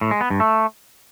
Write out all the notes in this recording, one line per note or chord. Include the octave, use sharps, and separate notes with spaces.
A2
G#3
B3
G2
A3